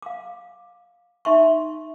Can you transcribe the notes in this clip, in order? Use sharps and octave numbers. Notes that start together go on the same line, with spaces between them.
F5 D6
D#4 E5 C6 C#6